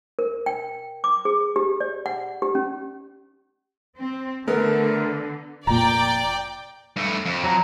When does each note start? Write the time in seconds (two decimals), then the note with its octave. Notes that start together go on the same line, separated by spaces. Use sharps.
0.19 A#4
0.46 G5
1.04 D6
1.25 G#4
1.56 G4
1.81 D5
2.06 F#5
2.42 G4
2.55 C#4
3.98 C4
4.48 D3 A3 B3 A#4
5.67 F1 A#2 D5 G5 A#5
6.96 G2 A3
7.26 F2
7.44 F#3 A#5